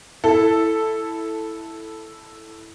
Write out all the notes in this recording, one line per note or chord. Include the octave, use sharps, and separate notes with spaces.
E4 A4